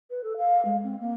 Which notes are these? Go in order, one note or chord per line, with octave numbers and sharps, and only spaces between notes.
B4
A4
F5
G#3
C4
A#3